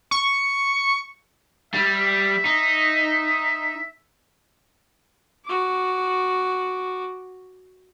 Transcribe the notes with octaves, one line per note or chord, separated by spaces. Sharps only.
C#6
G3 E5
D#4
F#4 D6